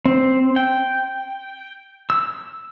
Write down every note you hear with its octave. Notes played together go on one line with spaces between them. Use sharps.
C4
G5
E6